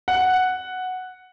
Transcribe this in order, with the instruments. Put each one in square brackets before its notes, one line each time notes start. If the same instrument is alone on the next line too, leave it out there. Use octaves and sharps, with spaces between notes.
[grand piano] F#5